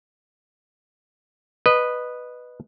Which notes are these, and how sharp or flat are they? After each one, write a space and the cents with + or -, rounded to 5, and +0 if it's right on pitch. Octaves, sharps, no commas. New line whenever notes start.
B4 +0 D#5 -15